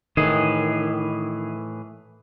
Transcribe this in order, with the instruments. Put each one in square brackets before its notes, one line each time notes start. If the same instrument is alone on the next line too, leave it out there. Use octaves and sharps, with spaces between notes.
[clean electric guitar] A2 E3 G#4 [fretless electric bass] D#3